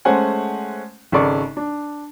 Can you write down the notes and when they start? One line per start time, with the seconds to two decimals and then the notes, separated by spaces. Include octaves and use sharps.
0.05 G#3 A3 C#4 C5 F#5 G#5
1.12 G#1 C#3 A4 D5 C#6
1.57 D4